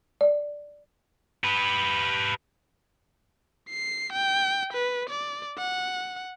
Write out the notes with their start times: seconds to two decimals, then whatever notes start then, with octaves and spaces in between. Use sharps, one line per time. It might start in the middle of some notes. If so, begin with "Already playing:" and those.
0.21 D5
1.44 G4 B4
3.70 C7
4.13 G5
4.73 B4
5.10 D5
5.58 F#5